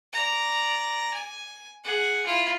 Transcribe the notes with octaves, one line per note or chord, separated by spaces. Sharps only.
D5 A#5
G#5
G#4 F#5
E4 F4